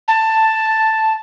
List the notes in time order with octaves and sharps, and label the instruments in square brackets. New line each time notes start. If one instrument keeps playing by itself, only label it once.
[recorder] A5